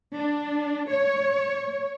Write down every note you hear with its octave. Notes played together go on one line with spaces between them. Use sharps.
D4
C#5